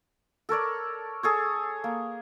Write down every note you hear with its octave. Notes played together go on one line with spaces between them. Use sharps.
A4 A#4 C#5 D5
G#4 A4 C#5
A#3